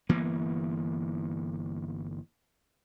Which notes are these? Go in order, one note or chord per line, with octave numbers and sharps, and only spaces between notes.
G1 E3 A#3 B3